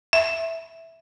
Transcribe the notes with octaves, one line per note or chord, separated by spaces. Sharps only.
E5